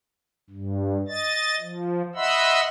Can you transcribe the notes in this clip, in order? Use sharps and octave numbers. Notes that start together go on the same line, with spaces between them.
G2
D#5 A6
F3
D#5 E5 F#5 B5 C6 E6